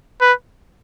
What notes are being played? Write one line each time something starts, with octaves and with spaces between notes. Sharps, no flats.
B4